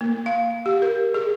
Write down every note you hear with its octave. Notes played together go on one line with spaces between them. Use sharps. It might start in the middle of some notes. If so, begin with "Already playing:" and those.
A#3
F5
G4
A#4
G#4